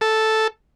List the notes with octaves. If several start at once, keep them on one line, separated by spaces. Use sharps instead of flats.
A4